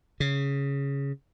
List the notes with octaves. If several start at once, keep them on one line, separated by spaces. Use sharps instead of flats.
C#3